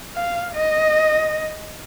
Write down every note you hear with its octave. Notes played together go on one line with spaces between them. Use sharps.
F5
D#5